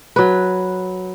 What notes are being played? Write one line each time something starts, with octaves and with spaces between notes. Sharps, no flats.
F#3 B4